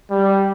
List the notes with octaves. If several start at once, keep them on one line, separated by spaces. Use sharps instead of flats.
G3